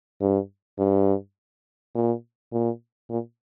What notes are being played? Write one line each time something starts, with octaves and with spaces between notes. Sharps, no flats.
G2
G2
A#2
A#2
A#2